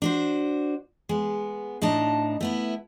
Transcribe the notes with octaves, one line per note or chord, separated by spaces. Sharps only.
D4 F#4 C5
G#3 B3
A2 D4 D#4 A5
A3 B3 E4